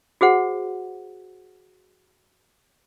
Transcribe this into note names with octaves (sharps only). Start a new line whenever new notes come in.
F#4 G#4 C5 F#5